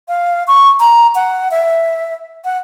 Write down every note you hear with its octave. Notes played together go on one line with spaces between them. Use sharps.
F5
C#6
A#5
F#5
E5
F#5